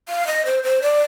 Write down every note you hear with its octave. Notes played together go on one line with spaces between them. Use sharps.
F5
D#5
C5
C5
D5